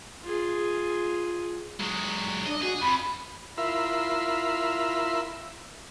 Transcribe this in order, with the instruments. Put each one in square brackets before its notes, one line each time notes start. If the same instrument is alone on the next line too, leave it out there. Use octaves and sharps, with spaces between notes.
[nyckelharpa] F4 G#4
[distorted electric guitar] F#3 G#3
[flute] D4 [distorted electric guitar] D#5
[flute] F#4 [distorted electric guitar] G#4
[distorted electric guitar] F2 [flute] B5
[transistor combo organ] E4 F4 A#4 E5 B5 C6